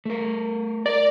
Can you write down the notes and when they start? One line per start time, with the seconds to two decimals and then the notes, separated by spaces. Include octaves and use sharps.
0.05 A3 A#4
0.86 A#4 D5